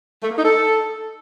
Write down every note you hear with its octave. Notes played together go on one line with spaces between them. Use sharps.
A3
A#3
D#4
A4